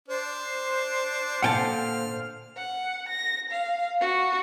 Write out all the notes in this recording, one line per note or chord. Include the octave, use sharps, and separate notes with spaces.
D4 C5
A#2 D3 F#5 G5 A5 F6
F#5
A#6
F5
F#4